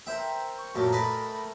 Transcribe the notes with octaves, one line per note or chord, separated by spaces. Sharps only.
A#4 C5 E5 G5
C#6
F#2 A#2 F#3 A3 A#4
B4 D5 D#5 B5